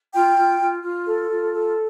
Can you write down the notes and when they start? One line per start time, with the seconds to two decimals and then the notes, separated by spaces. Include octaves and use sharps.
0.12 F4 G5
0.36 F4
0.60 F4
0.83 F4
1.06 A4
1.29 F4
1.53 A4